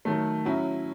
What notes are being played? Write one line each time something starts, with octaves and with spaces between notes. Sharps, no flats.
D#3 F#3 A3
F#3 C#4 E4